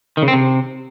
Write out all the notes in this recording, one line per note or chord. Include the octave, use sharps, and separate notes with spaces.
D#3
C#3
C4
C3